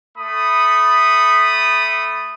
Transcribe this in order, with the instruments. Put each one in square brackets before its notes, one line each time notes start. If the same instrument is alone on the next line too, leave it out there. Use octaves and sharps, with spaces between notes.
[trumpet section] A3 B5 D#6